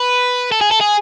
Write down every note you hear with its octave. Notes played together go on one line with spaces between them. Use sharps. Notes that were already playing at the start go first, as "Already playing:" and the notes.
Already playing: B4
A4
G#4
A4
G#4